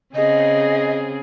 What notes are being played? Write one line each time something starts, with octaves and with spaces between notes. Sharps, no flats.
C#3 C4 G#4 D#5